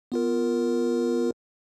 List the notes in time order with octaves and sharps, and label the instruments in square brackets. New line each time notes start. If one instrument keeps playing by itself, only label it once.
[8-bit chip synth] B3 F4 A#4